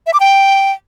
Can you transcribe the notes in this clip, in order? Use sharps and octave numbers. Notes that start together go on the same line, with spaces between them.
E5
D6
G5